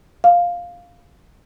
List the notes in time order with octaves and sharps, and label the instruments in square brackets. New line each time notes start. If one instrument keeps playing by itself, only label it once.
[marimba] F5